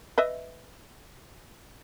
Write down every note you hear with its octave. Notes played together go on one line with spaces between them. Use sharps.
B4 D#5 E5